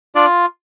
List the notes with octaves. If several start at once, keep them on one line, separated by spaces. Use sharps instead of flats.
D4 F4 D5